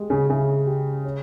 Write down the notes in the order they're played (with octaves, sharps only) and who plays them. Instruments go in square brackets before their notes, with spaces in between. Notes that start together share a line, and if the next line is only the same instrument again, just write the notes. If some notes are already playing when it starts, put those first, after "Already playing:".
Already playing: [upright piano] G#3 G4
[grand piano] C#3
[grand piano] C#3 [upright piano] E4
[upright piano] G4
C#4